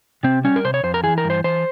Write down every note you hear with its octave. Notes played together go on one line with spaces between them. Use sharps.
C3 C4
G3 C#4
A#4
C3 C5
C#5
F2 C5
A#4
E3 G#4
A#4
G2
C5
E3 C5